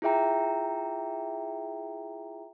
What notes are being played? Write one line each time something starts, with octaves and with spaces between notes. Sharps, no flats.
E4 F4 G#4 E5 G5 A#5